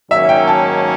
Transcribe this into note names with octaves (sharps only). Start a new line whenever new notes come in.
G#2 D#3 F#3 A#3 C#4 E5
G5
A5